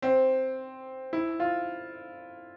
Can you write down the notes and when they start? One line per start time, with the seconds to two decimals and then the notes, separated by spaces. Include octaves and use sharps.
0.02 C4
1.13 E4
1.40 F4